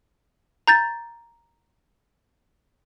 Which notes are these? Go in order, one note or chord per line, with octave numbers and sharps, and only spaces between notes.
A#5 G6 A6